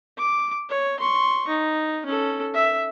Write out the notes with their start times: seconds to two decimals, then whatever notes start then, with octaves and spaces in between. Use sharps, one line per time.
0.18 D6
0.69 C#5
1.00 C6 C#6
1.48 D#4
2.06 C#4 A4
2.54 E5